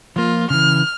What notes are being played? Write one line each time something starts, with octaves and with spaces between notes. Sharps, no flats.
F3 A#3 F4
C#3 E3 F6